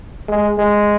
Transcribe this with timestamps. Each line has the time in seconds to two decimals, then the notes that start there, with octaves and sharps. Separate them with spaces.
0.28 G#3
0.58 G#3